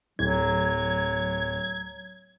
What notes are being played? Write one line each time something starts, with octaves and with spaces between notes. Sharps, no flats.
D1 F#3 G#6